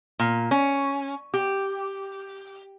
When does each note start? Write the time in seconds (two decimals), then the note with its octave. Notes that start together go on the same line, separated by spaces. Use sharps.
0.19 A#2
0.51 C#4
1.34 G4